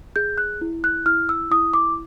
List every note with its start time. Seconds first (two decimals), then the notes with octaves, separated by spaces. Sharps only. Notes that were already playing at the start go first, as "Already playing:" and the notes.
0.16 G#4 G6
0.38 F#6
0.61 E4
0.84 F#6
1.06 E4 F6
1.29 E6
1.51 E4 D#6
1.74 D6